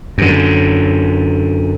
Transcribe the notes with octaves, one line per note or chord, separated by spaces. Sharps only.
F#2 D3